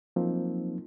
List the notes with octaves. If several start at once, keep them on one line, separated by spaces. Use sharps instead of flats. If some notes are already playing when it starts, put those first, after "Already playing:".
F3 F#3 A#3 C4 D#4